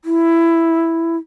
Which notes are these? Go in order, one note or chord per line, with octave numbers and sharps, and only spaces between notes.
E4